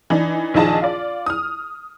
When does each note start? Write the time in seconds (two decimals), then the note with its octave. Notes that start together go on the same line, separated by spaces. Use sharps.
0.10 E3 D4 D#4
0.54 A#1 D#3 F3 G#4 D#5 A5
0.82 F4 D5
1.26 D#6 F6